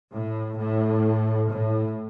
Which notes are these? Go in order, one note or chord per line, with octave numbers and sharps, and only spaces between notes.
A2
A2
A2